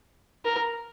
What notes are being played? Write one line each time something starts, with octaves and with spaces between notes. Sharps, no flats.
A#4